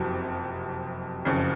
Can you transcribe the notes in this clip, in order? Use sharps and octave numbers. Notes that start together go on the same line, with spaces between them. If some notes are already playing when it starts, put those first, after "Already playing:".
Already playing: F#1 F2 C3 F#3
F#1 F2 C#3